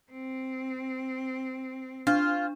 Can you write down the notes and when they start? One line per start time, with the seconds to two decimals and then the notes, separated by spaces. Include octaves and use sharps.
0.12 C4
2.07 D4 F4